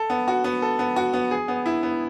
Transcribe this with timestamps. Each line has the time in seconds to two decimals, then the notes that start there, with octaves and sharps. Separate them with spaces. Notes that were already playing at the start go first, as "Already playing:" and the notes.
Already playing: A4
0.10 B3
0.28 F#4
0.44 B3
0.62 A4
0.79 B3
0.96 F#4
1.13 B3
1.31 G#4
1.48 B3
1.66 E4
1.83 B3